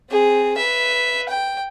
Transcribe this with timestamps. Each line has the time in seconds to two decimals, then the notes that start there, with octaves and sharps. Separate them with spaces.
0.10 C4 G#4
0.57 B4 E5
1.29 G5